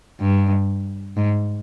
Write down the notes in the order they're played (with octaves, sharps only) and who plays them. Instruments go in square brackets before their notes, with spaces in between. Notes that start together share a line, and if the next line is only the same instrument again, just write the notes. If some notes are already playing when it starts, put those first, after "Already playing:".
[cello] G2
G#2